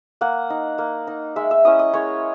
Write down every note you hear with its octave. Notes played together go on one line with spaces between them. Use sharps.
A#3 F#5
D#4
A#3
D#4
G#3 E5
E5
C#4 E4 D#5
D#5
G#3 C#5